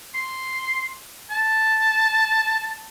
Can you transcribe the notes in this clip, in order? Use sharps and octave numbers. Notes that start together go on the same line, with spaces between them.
C6
A5